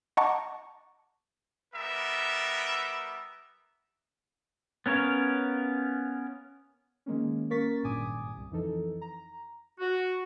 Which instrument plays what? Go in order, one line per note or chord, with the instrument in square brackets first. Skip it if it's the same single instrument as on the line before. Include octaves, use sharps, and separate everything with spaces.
[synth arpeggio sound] D#5 F#5 A5 A#5 C#6 D6
[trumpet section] G3 B3 A#4 E5
[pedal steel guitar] B3 C#4 A#4 C#5 F5
[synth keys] D#3 G#3 A#3 C#4
A#3 C#4 A#4 C#6 A6 B6
G#1 G2 A#2 G#5 D6 D#6
C2
F2 E3 D#4 A4
A#5
[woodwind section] F#4